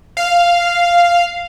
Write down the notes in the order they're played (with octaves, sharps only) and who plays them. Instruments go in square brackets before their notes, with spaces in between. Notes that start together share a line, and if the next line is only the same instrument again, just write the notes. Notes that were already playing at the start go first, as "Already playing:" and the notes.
[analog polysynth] F5